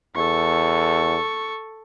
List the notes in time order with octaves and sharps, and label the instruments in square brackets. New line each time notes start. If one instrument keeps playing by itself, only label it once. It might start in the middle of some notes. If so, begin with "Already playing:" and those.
[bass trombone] E2 [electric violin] A4 C#6